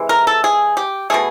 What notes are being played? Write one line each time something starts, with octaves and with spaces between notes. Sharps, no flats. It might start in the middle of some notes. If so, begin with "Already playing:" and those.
Already playing: C3 E3 G#3
A#4
A4
G#4
G4
B2 F#3 A3 G#4